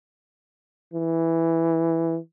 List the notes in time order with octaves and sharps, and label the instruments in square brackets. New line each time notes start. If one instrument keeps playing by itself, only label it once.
[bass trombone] E3